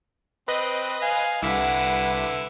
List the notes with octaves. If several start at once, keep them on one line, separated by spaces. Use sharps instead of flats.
C4 B4 D#5
F5 G#5
C2 D3 E4 B4 F#5 B6